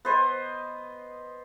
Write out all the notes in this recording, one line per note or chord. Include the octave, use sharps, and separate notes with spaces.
B3 C5 D#5